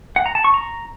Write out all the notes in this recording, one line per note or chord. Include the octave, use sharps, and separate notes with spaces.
F#5
A#5
A5
C#6
A#5